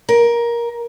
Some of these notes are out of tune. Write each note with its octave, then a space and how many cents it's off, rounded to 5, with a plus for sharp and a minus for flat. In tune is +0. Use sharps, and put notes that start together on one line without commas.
A#4 +15